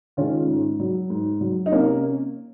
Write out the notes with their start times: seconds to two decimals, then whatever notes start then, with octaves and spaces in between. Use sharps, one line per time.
0.17 D#3 G#3 C#4 F4
0.48 G#2
0.80 F#3
1.10 G#2
1.41 F#3
1.66 D#4
1.72 C3 A#3 C#4